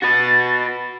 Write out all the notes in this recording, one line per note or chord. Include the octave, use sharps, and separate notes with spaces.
F#4 B4 A6